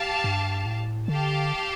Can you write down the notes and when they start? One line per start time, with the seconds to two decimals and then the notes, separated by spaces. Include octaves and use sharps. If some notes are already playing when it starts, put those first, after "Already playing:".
Already playing: G4 F5 A5
0.24 G2
0.66 A2
1.08 D3 G4 F5 A5